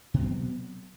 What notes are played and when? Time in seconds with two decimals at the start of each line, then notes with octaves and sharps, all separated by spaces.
0.14 B2
0.17 B3
0.20 C4
0.23 F#3